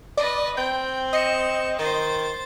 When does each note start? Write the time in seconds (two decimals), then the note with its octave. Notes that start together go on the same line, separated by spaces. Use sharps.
0.17 B4 D5 D#5
0.57 C4 G5 G6
1.13 D#5 C#7 E7
1.79 D#3 C5 A6